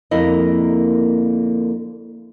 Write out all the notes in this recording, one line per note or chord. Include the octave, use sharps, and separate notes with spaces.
F2 D3 A#3 E4 A#4 D#5